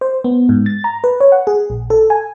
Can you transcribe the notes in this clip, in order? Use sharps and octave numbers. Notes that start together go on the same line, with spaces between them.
C5
B3
G#2
A6
A#5
B4
C#5
F#5
G#4
A#1
A4
G#5